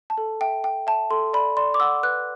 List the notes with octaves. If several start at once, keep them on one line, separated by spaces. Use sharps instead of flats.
A5
A4
E5 G5
G5
E5 A5
A4 C6
D5 B5
D5 C6
D6
F#5 E6
B4 F#6